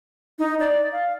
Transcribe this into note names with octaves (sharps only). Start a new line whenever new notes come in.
D#4
D5
F5